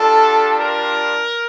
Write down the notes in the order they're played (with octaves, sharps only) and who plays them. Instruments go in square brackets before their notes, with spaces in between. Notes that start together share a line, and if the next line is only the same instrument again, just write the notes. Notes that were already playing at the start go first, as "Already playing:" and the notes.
Already playing: [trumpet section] G3 D4 F4 A4
A#4